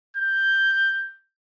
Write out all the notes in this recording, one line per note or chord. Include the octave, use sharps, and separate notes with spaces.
G6